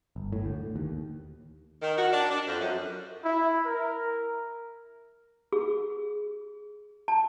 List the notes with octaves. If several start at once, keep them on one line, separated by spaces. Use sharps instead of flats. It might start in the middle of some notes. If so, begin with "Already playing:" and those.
G1
A2
D2
D#2
D#3
F#4
D4
D4
F2
F#2
E4
A#4
G#4
A5